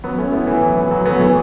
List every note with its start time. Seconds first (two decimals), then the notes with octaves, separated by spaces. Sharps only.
0.04 F#3 B3
0.18 A3 C#4
0.32 B3 E4
0.47 E3
0.62 F#3
0.76 E3 A3
0.91 F#3
1.05 F#3 B3
1.20 E3 A3